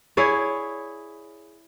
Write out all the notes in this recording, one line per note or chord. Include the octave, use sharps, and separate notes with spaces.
E4 G#4 C#5 D5